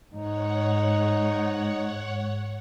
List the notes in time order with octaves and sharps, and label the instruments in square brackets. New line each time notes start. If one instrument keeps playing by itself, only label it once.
[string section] G#2 [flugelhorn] D#4 [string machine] C#5 F#5